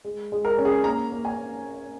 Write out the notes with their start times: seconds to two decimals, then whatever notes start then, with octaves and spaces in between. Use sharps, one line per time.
0.04 G#3
0.32 G#3
0.45 A#4
0.58 C#4
0.65 G#4
0.84 A#3 A#5
1.12 A#3
1.25 G#5